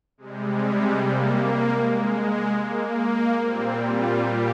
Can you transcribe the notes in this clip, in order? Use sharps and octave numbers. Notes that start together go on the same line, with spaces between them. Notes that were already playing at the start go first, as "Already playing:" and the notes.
C3 G3 G#3
A#3
G#3
A#3
A#2 G3 C4
F4
G4